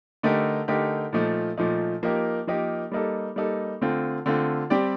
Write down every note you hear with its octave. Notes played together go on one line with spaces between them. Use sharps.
D3 A3 D#4 G4 A#4
D3 A3 D#4 G4 A#4
A#2 F3 A3 D#4
A#2 F3 A3 D#4
F3 A#3 D#4 G4 A#4
F3 A#3 D#4 G4 A#4
G3 A#3 D#4 A4
G3 A#3 D#4 A4
D3 A3 C4 F4
D3 A3 C4 F4
G3 C4 G4 D5